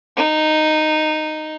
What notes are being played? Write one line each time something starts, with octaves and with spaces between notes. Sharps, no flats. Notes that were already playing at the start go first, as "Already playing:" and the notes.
D#4